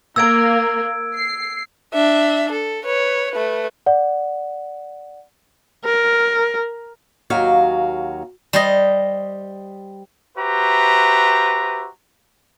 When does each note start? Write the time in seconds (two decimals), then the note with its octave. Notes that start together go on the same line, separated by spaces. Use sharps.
0.16 A#3 E6 G#6 D7
1.15 C7
1.93 D4 E5
2.52 A4
2.85 B4 C#5
3.32 A3 B4
3.86 D5 F#5
5.85 A#4
7.30 D#2 F#3 F#4 F5
8.53 G3 C5 D#5
10.38 F#4 G4 B4 C5 E5 A#5